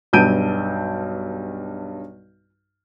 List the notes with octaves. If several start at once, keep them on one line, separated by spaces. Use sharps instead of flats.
B1 G2 A5 G6 D7 D#7